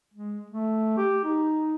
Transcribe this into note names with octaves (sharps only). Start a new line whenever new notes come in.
G#3
A3
G4
D#4